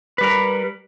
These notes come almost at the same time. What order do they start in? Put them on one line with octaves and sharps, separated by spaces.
B4 G3 A#4